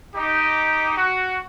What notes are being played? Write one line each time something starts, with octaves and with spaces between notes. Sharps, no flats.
D#4 G4
F#4